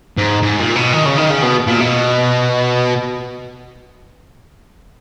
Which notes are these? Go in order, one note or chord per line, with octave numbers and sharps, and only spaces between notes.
G#2
G#2
A#2
B2
D#3
C#3
D#3
C#3
B2
A#2
B2